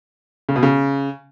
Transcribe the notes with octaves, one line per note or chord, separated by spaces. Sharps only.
C#3
B2
C#3